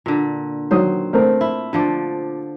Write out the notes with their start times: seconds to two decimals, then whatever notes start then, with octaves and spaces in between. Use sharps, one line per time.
0.06 A#2 D3
0.71 D#3 F#3 C5 D#6
1.13 A3 C4 A#4
1.41 E4
1.73 D3 F3 D5